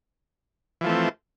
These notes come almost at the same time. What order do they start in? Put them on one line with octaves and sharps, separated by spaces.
E3 F3 A3 C4